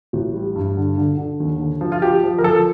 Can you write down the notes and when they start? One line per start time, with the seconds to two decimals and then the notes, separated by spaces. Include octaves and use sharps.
0.13 A1
0.34 G3
0.56 G2
0.77 D3
0.98 D3
1.18 D3
1.40 D#2
1.60 D3
1.81 F3
1.92 F4
2.02 F3 G4
2.24 F3
2.38 A#4
2.44 F3 A4